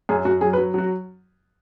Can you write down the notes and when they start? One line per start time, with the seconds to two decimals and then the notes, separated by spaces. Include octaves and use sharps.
0.09 F#2 G#4
0.25 F#2 F#4
0.41 F#3 G#4
0.53 B4
0.58 F#3
0.74 F#3 F#4